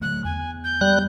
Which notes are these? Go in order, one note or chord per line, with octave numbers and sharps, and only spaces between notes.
D3 F#3 A3 F#6
E2 G#5
G6
G3 F#6